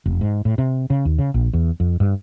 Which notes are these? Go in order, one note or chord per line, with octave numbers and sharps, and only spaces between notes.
F1
G#2
A2
C3
C#3
D#2
C#3
A#1
E2
F2
G2